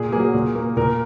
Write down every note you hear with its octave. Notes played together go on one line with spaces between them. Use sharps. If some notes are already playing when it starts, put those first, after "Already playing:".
Already playing: A#2 G#4
F#3 A#3 G#4
A#2
A#3
A#2 A#4